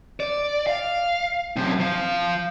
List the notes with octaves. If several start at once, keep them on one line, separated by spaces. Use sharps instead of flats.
D5
F5
F#2 C3
F3 F5